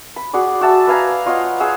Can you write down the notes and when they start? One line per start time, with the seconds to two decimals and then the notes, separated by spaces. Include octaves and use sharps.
0.16 B5
0.33 F#4 G#4 D5
0.61 F#4 E5 A5
0.87 B4 F5 G#5 A#5
1.26 F4 C#5 D#5 F#5
1.60 G#4 C#5 F#5 E6